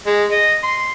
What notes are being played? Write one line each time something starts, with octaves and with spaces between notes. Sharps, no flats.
G#3
D#5
C6